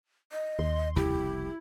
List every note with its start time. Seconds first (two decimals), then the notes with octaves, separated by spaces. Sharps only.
0.32 D#5
0.59 D#2 C6
0.96 F1 C2 C#3 E4 G4